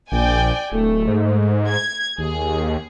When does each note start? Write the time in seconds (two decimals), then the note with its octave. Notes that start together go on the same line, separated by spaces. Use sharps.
0.12 A#1 D5 G5 G#5
0.72 D1 A3
1.07 G#2
1.67 G#6
2.18 D#2 G#4